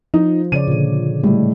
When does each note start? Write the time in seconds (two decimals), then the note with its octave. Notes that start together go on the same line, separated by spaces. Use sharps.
0.14 F3 D#4
0.52 C#3 C#5 D5 D#7
0.68 A#2 D3
1.24 A2 G3 G#3